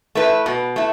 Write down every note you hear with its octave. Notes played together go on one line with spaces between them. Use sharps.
A3 E4 B4
B2
A3 E4